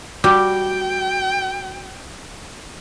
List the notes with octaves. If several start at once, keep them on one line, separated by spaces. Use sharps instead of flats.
G3 F#4 G5 D6